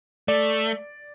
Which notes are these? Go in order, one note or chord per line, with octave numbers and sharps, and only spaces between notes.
A3 D5